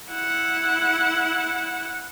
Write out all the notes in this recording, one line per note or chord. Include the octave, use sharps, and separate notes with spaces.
E4 F#5